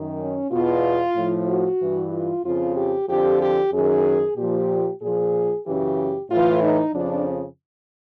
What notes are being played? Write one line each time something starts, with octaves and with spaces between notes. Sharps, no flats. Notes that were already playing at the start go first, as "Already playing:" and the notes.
Already playing: F#2 D#3
C#4
E2 B2 F4
A2 F3
F#4
G2 E3
F4
F2 C#3 F3 F4
G4
F2 D3 F3 G4
G4
F#2 D#3 G#4
A#2 F3 G4
A#2 F3 G#4
F#2 C#3 E3 G4
A2 E3 F4
D#4
F2 C#3 F3 D4